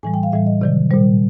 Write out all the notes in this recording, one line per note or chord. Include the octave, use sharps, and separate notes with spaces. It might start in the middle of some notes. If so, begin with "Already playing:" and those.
A2 E3 G3 G#5
G5
F5
A2 E3 G3 E5
D#5
C3 D#3 F#3 D5
A#2 G3 C5